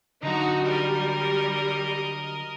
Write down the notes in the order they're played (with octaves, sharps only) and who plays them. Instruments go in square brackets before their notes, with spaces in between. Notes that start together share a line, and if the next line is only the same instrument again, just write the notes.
[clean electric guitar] D3 F#3 [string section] D#4 F#4 [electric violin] A#5
[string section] G3 [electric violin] A#4 D#5